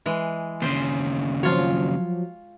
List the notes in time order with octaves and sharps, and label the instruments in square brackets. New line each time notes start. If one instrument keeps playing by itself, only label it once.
[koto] E3 G#3
[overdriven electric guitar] D#2 C#3 [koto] C5
[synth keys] F3 F#3 [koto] F4 C#5